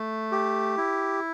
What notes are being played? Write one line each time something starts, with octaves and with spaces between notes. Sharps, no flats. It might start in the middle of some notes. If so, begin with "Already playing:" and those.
Already playing: A3
G4
E4